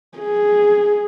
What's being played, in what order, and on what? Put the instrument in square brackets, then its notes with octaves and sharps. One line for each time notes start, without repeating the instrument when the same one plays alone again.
[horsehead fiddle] G#4